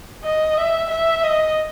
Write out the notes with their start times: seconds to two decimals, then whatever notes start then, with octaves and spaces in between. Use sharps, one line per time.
0.24 D#5
0.58 E5
0.90 E5
1.23 D#5